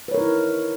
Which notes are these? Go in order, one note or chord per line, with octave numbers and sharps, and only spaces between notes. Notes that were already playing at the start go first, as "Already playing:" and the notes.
D#4 E4 A#4 B4 C#5